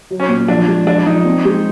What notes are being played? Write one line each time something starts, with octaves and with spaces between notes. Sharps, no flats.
F#3
C#4
A#2
F3 D4
G#3
F3 D4
F3 D#4
C4
G#3